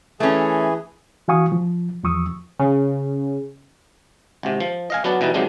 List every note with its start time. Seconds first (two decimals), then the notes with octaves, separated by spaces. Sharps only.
0.20 E3 A3 C#4 G#4
1.28 E3 F#4 F5 G#5 C#6 D#6
1.52 F3
2.04 E2 F3 C#6 D#6 E6
2.59 C#3
4.43 G#1 C3
4.60 F3
4.90 D#5 F5 G#5
5.04 F#3 B3 D4 A5
5.21 B2 E3 G3 D#4
5.34 C3 D#3 F3 F#3 G#3 D4